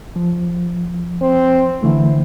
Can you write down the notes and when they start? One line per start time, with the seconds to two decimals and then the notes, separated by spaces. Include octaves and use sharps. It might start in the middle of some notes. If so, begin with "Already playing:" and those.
0.16 F3
1.21 C4
1.83 D3 E3 A3 E4